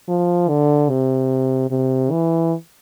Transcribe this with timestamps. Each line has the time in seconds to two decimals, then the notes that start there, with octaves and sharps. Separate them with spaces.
0.08 F3
0.49 D3
0.89 C3
1.71 C3
2.11 E3